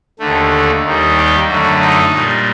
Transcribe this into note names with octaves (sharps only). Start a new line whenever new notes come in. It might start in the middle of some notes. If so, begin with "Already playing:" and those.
D#2 D3 A3
D#2 D#3 G3
G4
F#2 D3 A3 F#4
D#4
A#2 G3